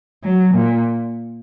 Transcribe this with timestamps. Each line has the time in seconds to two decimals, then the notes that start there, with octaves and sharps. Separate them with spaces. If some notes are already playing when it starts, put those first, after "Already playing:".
0.24 F#3
0.54 A#2